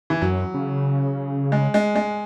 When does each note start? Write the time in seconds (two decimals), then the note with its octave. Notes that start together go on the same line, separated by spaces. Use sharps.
0.10 E3
0.21 F#2 F#3
0.54 C#3
1.52 G#3
1.74 G#3
1.96 G#3